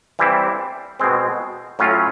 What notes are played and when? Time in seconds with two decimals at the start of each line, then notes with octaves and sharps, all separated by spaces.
0.19 E3 G3 C4 E4
1.00 B2 G#3 C4
1.79 A2 F#3 A3 C#4 F4